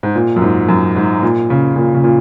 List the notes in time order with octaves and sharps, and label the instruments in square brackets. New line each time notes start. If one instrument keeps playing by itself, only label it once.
[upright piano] G#2
A#2
F#2
G#2
F#2
G#2
A#2
C#3
A#2
C#3
A#2